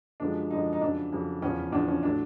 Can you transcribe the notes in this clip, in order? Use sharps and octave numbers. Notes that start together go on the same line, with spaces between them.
F#2 D3 F3 G#3 D4
F#2 D3 F3 G#3 D#4
D#4
F2 C#3 F#3 D4
F2 C#3 F#3
E2 C#3 F3 C#4
E2 C#3 F3 D4
C#4
A2 F#3 D4